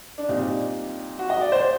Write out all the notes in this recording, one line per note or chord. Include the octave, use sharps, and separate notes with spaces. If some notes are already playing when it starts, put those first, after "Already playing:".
D4
A#2 G3 C4 D#4
F#4
D#5
D5
C5